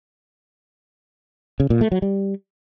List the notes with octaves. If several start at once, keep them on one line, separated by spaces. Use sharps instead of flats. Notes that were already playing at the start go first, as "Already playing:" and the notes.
C#3
A#2
A3
F#3
G3